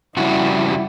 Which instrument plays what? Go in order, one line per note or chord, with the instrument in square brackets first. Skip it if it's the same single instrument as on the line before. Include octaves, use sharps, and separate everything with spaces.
[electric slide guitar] F2 C#3 F#4 [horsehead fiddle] G3 E4